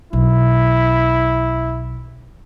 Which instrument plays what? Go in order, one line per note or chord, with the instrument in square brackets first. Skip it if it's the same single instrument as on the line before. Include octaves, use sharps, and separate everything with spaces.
[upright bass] B1 [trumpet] E4